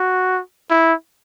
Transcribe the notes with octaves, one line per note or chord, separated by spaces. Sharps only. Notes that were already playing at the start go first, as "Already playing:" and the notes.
Already playing: F#4
E4